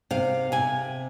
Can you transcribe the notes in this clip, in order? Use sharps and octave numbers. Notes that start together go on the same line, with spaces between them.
C3 F5
C3 G#5